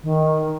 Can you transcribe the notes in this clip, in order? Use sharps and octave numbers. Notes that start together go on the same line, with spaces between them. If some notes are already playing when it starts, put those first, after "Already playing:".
D#3